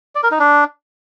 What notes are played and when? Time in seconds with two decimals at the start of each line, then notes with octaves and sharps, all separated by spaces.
0.15 D5
0.23 A#4
0.31 D#4
0.39 D4